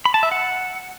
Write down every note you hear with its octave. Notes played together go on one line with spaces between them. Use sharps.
B5
A5
E5
F#5